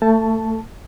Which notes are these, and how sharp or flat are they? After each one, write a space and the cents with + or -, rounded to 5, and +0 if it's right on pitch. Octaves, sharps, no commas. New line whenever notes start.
A3 +25 A4 +0 A5 +0